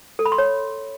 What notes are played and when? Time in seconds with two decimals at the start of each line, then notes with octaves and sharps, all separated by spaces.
0.19 A4
0.26 B5
0.32 C6
0.38 C#5